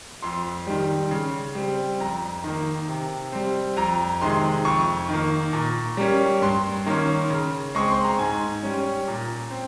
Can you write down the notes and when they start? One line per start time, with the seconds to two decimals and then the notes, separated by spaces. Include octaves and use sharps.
0.23 F2 C6
0.67 D#3 G3
1.11 C#3
1.55 G3 C4
2.00 F2 A#5
2.44 D#3 A#3
2.88 C3
3.32 G3 C4
3.77 F2 A#5
4.21 C3 D#3 G#3 C6
4.65 F2 C#6
5.09 D#3 A#3
5.53 A#2
5.97 G3 A#3 C#4
6.42 G2 C6
6.86 D#3 A#3 C#4
7.30 C#3
7.75 G#3 C4 C#6
7.91 C6
8.04 A#5
8.19 G#2 G#5
8.63 G3 C#4
9.08 A#2
9.51 C4